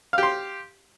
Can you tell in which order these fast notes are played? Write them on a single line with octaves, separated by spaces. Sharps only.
F5 G4 C6